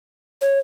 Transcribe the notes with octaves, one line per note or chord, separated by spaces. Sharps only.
C#5